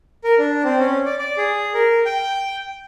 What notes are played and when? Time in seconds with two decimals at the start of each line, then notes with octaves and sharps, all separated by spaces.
0.24 A#4
0.39 D4
0.64 C4
0.79 C#4
1.06 D5
1.19 D5
1.38 G#4
1.74 A#4
2.06 G5